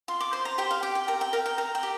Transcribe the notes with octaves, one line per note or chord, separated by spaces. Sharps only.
F4 C6
D6
C5 C6
A#5
G4 G5
F5
G4 G5
G5
A#4 A#5
G5
A#4 F5
G5
A#4 A#5
G5
G4